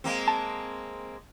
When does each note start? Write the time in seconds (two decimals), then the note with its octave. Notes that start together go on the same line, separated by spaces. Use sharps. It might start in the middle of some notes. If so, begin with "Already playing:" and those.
0.04 G#3 A#3 C4
0.28 A5